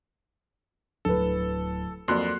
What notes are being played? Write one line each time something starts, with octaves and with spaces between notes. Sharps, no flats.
D1 A4 B4
F2 F#3 A#3 D5 C6 F#6